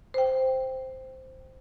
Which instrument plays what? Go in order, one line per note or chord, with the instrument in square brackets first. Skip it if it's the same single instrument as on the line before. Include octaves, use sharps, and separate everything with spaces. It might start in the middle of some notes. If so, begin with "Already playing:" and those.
[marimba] C5 G5